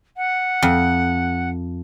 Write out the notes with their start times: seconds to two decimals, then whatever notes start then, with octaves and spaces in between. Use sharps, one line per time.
0.17 F#5
0.63 F2